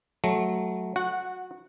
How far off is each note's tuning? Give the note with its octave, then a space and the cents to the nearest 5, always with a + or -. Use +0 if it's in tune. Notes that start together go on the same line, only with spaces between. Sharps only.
F#3 +0 A3 -15
F#4 -20 F#5 +0